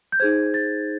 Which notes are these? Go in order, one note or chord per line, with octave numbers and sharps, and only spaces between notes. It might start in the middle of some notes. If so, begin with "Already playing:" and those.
G6
D#4 G#4 C5 G#6
A6